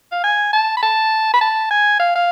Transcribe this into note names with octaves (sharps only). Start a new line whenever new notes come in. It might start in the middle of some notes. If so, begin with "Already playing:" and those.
F5
G#5
A5
B5
A5
B5
A5
G#5
F5
F5